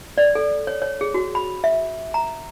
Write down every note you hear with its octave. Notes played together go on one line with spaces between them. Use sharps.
D5
A4
C#5
C#5
G#4
F#4
B5
E5
A#5